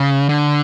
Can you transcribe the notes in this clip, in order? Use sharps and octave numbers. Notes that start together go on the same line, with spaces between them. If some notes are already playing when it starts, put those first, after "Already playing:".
Already playing: C#3
D3